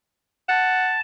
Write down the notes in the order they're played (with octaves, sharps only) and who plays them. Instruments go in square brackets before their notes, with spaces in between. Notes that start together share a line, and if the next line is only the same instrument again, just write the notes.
[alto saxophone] F#5 [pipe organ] A5